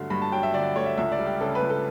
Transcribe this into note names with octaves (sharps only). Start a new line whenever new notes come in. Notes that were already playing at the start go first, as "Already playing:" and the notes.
Already playing: G2 D3 F#3 A3
G2 B5
A5
F#3 G5
E5
D3 D5
A3 C#5
E5
C#2 E5
D5
G3
G4
C#3 A4
B4
C#2
A4